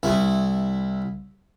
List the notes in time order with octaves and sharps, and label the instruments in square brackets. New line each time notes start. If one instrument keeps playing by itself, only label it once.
[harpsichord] C2 E4